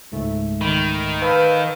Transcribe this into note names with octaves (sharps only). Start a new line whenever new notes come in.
C#2 G#2 A3
D#3 B5
B4 F5 A5 E6 G6